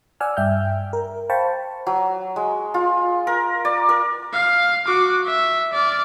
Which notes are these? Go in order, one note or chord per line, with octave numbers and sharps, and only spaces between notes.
D5 F#5 G#5 E6 F6
G2 E5 G5 F6 G6
A#4
C5 F5 G5 A5 B5 C#6
F#3
G#3
F4
A#4
D5
A#4
F5
F#4 D6
E5
D5 F6